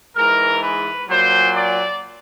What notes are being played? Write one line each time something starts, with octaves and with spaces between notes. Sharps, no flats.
G#2 E3 G#3 A#4
B4
A#2 F#3 C5
D5